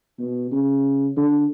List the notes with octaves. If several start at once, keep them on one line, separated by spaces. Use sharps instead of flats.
B2
C#3
D3